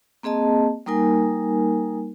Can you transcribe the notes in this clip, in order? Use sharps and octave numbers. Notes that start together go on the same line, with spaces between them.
A#3 C4 G#4 D#5 A5
G3 A#3 D#4 A#4 G#5